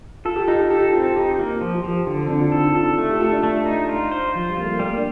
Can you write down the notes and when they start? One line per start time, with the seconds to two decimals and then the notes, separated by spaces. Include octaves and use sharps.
0.25 F4 A4
0.36 G4
0.47 D#4 F4
0.59 G4
0.70 G4 A4
0.93 C4 F4
1.16 D#4 G4
1.39 A#3 F4
1.61 F3 G4
1.74 F4
1.84 F3 G4
2.06 D3 F4
2.26 C4
2.30 D3 D4
2.41 F4
2.52 D#4 A4
2.75 F4 A4
2.98 A3
3.09 G4
3.20 F4 A4
3.32 D4
3.43 A3
3.65 D#4
3.89 F4
4.11 C5
4.34 F3 F4
4.49 G3
4.57 A#3 F4
4.64 A3
4.80 G3 A#3
4.97 D4